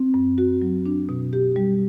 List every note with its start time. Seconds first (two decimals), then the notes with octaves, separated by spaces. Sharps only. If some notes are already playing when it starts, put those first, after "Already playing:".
Already playing: C4
0.14 F#2
0.38 F#4
0.62 F#3
0.86 D4
1.09 B2
1.33 G4
1.56 G3